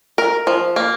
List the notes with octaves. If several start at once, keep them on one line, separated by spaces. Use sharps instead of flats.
A#4
F3
A#3